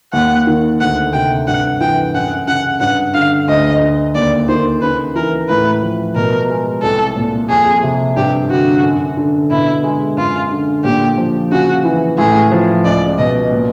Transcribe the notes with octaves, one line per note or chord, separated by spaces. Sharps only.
D#2 F#5
D#3
D2 F#5
C3 G5
G2 F#5
E3 G5
F#2 F#5
C#3 F#5
G2 F#5
D3 F5
D2 D#5
D3
D#2 D5
D#3 C5
C#3 B4
E3 A#4
A2 B4
F3
B2 A#4
G#3
C2 A4
A#2
F2 G#4
C3
G2 G4
D3 F#4
F#2
D3
B2 E4
G#3
F#2 F4
D3
A#2 G4
F3
C#3 F#4
E3
A2 G#4
F3
C#2 D5
B2 D#5
A#2